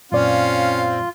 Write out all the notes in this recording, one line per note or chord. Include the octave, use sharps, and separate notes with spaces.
F#2 A#2 C4 C#4 F4 D5 F5